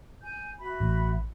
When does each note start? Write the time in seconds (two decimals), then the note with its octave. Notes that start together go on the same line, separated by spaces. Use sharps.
0.23 G#5 G6
0.60 F#4 E5 B5
0.80 A1